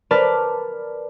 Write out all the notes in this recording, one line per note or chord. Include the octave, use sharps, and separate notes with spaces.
A#4 B4 D5 A5 F6